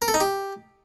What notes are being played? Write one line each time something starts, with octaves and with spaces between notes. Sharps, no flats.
A#4
A4
D#4
G4